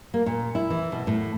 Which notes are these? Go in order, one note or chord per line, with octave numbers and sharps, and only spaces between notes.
A#3
A#2
E4
E3
B2
A2